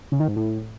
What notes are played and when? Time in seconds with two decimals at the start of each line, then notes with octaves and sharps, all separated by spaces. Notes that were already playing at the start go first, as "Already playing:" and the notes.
0.12 C#3
0.20 D#3
0.28 G#2
0.36 A2